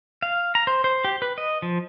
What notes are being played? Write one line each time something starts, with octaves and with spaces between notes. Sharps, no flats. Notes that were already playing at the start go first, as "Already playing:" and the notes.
F5
A#5
C5
C5
G4
B4
D#5
F3